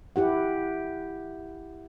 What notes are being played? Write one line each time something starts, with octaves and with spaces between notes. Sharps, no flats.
E4 G4 F#5